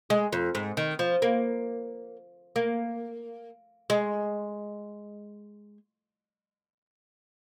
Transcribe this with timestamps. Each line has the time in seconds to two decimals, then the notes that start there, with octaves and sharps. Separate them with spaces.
0.10 G#3
0.33 F2
0.55 G#2
0.77 D#3
0.99 F3
1.22 A#3
2.56 A#3
3.90 G#3